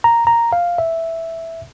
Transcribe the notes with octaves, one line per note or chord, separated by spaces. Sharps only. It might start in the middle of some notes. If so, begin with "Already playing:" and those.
A#5
A#5
F5
E5